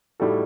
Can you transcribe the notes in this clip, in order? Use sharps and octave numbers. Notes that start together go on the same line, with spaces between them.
A2 G3 D#4 F#4 A4